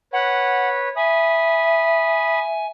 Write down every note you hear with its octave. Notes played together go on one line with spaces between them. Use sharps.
B4 C#5 F#5
E5 G#5 B5 D#6